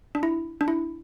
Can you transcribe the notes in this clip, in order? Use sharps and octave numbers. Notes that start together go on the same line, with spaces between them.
D4
E4
D4
E4